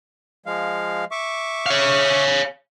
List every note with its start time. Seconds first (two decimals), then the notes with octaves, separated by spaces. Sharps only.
0.46 F3 G#3 F5
1.11 E5 C#6 D6
1.66 C#5 F5